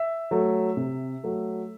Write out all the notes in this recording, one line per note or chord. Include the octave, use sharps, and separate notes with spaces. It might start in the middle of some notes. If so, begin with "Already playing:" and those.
Already playing: E5
F#3 A3
C3
F#3 A3